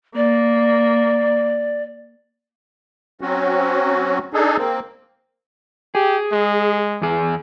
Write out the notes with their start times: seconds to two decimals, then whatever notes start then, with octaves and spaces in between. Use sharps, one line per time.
0.16 A#3 D5
3.21 F#3 C4 C#4 F#4
4.34 D4 D#4 G#4 A4
4.58 A#3 C4
5.95 G4 G#4
6.32 G#3
7.02 E2 G#4